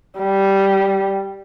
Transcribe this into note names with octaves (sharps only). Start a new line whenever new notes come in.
G3